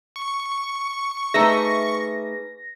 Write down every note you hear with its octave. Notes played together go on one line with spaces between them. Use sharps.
C#6
A3 D#4 G#4 B4 E5 A#6